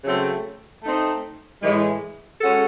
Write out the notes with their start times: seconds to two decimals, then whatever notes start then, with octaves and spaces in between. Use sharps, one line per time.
0.04 C#3 F#3 A3 C4
0.83 A3 C4 D#4
1.62 A2 E3 G#3
2.41 G#3 C#4 F#4 A4